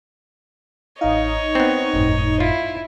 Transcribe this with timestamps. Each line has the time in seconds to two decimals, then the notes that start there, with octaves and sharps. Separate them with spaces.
1.01 A1 D#4 C#5 D#5 F5
1.55 B3 C4 C#6
1.94 G1 F2 A2
2.40 E4 F4